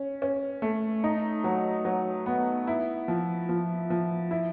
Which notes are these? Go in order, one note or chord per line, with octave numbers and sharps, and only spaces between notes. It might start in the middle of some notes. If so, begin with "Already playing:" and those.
Already playing: C#4
C#4
A3
D#4
F#3
F#3
B3
E4
F3
F3
F3
E4